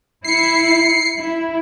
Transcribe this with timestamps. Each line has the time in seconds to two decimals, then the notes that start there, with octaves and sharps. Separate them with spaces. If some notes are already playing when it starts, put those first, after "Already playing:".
0.25 E4 C7 C#7
1.17 E4